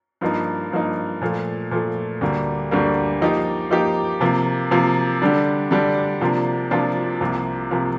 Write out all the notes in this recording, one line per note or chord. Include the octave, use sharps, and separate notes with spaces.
G2 F3 A#3 D#4
G2 F3 A#3 D#4
A#2 F3 A3
A#2 F3 A3
D2 D3 G3 A#3
D2 D3 G3 A#3
F3 A#3 D#4 G4
F3 A#3 D#4 G4
C3 F3 A#3
C3 F3 A#3
D3 G3 D4
D3 G3 D4
C3 F3 A#3 D4 F4
C3 F3 A#3 D4 F4
C2 C3 F3 A#3
C3 F3 A#3